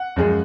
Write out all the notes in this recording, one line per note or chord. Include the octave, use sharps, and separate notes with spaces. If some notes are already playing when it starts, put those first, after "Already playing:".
Already playing: F#5
F#2 F3 G#3